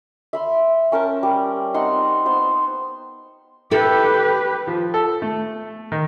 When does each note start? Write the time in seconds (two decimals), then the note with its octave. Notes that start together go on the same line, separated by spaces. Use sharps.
0.33 E5 B5 C6
0.92 C#4 A#4 G5 A5
1.23 G3
1.74 C4 D#4 F#5 C6
2.26 B3 C5 C6
3.71 E4 G4 A4 B4
4.67 F3
4.94 A4
5.22 A3
5.92 D#3